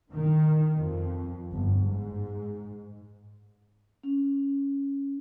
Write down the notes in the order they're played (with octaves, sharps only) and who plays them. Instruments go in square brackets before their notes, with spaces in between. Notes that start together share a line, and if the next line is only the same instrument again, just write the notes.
[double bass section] D#3
F2
G1
G#2
[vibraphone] C#4